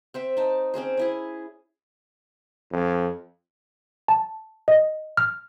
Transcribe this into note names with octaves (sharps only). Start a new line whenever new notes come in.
C4 C5 E5
D#4 A5
C4 C#4 G#4 C5
C#4 E4 G#4
F2
A5
D#5
F6